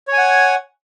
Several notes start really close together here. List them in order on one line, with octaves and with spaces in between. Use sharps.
C#5 G#5 F#5